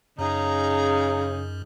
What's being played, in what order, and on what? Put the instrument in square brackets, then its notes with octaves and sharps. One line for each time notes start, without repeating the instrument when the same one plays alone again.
[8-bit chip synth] F#2 [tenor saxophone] C#3 [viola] D#4 G#4 [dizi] A#5